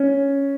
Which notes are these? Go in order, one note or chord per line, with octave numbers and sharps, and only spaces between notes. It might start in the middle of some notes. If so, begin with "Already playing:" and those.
Already playing: C#4